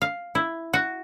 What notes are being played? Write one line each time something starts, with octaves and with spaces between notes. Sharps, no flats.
F5
E4
F#4